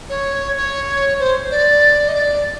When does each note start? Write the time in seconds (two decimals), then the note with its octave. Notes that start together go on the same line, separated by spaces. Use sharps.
0.09 C#5
0.57 C#5
1.20 C5
1.51 D5
2.08 D#5
2.15 D5